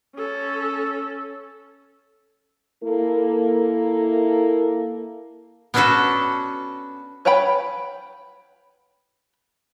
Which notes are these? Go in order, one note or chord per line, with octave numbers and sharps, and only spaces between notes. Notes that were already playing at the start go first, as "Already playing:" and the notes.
C#4 A4
A#3 E4 A4
B3 C#4 D4 F#4 A4 B4
B4 C#5 F#5 G5 B5